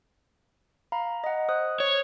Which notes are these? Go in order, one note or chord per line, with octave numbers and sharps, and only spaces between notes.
F5 A#5 B5
D#5 F#5
C5 D#6 F#6
C#5